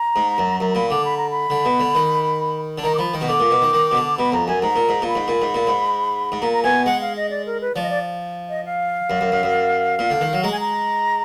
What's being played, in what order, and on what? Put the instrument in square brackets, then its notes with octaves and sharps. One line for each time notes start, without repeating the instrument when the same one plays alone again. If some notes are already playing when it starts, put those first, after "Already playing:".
Already playing: [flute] A#5
[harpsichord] G#2
F#2
[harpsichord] F#2 [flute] A#5
[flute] A#5
[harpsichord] A#2 [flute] B5
[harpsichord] D3 [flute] D6
[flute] B5
A#5
B5
[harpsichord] D3
B2
D3
D#3
D3
[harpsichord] D#3 [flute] A#5
[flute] D6
[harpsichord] F3 [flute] B5
[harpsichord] D#3
B2
[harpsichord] D3 [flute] D6
[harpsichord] A#2
B2
D#3
D#3
B2
D3
[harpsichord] B2 [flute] B5
[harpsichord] F2 [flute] A#5
[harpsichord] F#2 [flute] G#5
[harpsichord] G#2 [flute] A#5
[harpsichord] A#2
G#2
A#2
[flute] B5
[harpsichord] G#2
A#2
G#2
A#2
G#2
G#2
[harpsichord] A#2 [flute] A#5
[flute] A#5
[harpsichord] B2 [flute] G#5
[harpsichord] G#3 [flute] F#5
[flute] F5
D#5
D5
A#4
B4
[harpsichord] F3 [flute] D5
[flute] D#5
D5
D#5
F5
[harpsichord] F#2
F#2
F#2
F#2
A#2
D3
D#3
F#3
[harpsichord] G#3 [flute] A#5
[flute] G#5
A#5